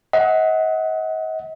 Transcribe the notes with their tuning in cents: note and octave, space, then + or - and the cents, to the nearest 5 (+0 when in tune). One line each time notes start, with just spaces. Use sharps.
D#5 +35 F#5 +0